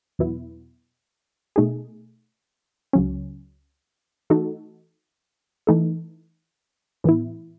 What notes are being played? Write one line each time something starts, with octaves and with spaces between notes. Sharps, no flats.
E2 B2 F#3 B3 E4
B2 A3 D#4 G#4
C#2 C#3 F#3 C#4
E3 A3 D#4 F#4 A4
E3 A3 D#4 A4
A2 E3 B3 E4